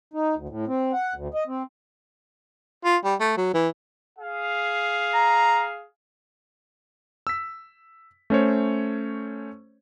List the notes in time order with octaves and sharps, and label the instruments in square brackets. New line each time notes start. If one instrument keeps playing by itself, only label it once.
[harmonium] D#4
D2
A2
C4
F#5
D2
D#5
C4
[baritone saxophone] F4
G3
A3
F#3
E3
[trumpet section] G#4 F5
[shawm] A#5
[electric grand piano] E6 B6
A3 C#4 C5 C#5